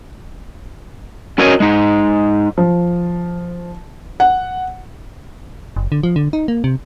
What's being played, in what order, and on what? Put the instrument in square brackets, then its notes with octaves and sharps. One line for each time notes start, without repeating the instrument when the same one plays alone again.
[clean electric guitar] C#4 F#4 A#4 C#5 D#5 G#5
G#3 D#4
[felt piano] F3
F#5
[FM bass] F#1
D3
F3
D3
D#4
A#3
C3